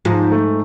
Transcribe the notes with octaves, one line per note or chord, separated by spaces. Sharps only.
G#2 F3
A3